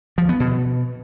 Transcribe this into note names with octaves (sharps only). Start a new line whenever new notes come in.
F3
B3
B2